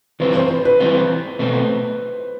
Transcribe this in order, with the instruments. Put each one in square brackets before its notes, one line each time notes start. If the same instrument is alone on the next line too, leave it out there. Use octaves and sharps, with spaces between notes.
[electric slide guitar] E3 G3 C4 F4 [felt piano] B4
[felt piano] C5
B4
B4
[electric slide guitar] E3 G3 C4 F4
B2 A3 C4